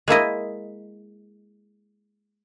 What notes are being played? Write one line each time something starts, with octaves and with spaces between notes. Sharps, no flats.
G#3 A#3 E4 D#5